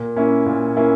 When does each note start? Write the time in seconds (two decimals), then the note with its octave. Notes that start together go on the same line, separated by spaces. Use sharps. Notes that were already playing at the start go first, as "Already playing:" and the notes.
Already playing: A#2
0.16 A#3 C#4 E4
0.46 A#2
0.77 A#3 C#4 E4